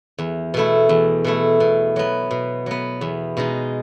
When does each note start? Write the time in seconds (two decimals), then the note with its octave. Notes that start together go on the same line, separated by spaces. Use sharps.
0.19 E2
0.54 B2 A3 E4
0.89 E2
1.24 B2 A3 E4
1.60 B2
1.96 F#3 B3
2.31 B2
2.66 F#3 B3
3.01 E2
3.37 B2 G#3 D#4